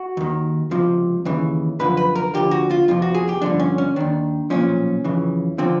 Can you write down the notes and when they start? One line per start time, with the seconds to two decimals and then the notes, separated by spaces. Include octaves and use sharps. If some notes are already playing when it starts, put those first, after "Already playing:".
Already playing: F#4
0.17 D#2 D#3
0.71 C#2 C3 F3
1.25 D#2 C#3 E3
1.79 F#2 D3 F3 B4
1.97 B4
2.15 A#4
2.34 D2 D3 F3 G4
2.51 F#4
2.71 F4
2.88 F2 C3 F3 F4
3.02 F#4
3.14 G#4
3.29 G4
3.42 G2 D3 F3 D4
3.60 C#4
3.78 C#4
3.96 D#2 D#3 D4
4.50 B1 A#2 F3 C#4
5.04 F2 C#3 E3
5.58 D3 F3 C4